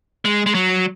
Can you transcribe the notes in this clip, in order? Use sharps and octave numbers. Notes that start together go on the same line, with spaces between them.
G#3
G#3
F#3